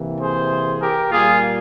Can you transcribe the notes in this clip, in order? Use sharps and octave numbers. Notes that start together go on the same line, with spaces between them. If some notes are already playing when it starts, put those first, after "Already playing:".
Already playing: C3 E3 A#3
G#4 C5
G4 A#4
A#2 G3 A#3 F4 G#4